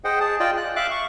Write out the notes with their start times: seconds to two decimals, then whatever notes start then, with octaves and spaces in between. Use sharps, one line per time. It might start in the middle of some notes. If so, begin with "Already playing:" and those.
0.04 G#4 C5 D#5 F#5 G5
0.20 G#4 A5
0.40 F4 D5 D#5 G5
0.57 F#6
0.76 E5 F5 D6 F#6
0.91 C#6